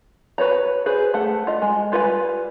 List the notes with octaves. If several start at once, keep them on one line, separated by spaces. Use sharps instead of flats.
F#4 B4 C#5 A#5
G#4 B4 C5
A3 F#5
F4 D#5
G#3
G3 F4 B4 F#5 G#5